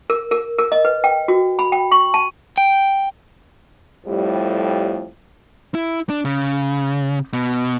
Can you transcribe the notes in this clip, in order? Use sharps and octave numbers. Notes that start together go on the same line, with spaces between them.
A#4
A#4
A#4
D#5
B4
G5
F#4
B5
G5
C#6
A5
G5
F2 A2 G3
E4
D4
C#3
B2